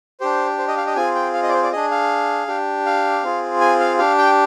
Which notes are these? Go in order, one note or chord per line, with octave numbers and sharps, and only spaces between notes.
D4 G4 C5
C5
D#5
F5
D#5
C4 F4 G#4 G#5
G5
F5
D#5
D5
C5
D5
D4 G#4 D#5
F5
D4 G4
F5
C4 F4 G#4
G#5
F5
D4 G4 F5
G5